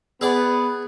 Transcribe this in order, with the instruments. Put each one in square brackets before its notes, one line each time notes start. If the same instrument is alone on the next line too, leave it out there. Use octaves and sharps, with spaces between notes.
[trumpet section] B3 [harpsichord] G#4 D5